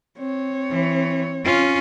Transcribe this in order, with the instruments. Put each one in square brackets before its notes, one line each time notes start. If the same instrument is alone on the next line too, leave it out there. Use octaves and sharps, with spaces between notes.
[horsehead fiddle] C4 C#5
[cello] E3
C#4 F4